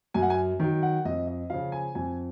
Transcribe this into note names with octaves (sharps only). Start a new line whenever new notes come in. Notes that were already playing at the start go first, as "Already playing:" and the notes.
F#2 G#5
F#5
G#5
D#3 F#3
F#5
F2 D#5
D#5
C#3 F3 F5
G#5
F2 G#5